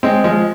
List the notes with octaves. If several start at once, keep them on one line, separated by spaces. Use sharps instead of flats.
G#3 C4
F3 G#3